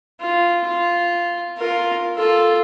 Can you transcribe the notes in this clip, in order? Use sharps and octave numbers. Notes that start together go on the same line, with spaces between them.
F4
F4
F4 A#4
F4 A4